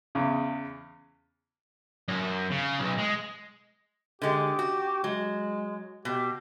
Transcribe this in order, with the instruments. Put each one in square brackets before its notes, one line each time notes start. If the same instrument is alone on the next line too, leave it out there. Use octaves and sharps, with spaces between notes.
[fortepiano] E2 C#3
[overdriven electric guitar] F#2
C#3
B1
G#3
[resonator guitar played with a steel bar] D3 G#3 [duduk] G4
[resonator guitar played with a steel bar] F#4
[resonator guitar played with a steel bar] F#3 [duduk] G#3
[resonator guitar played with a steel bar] B2 [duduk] G4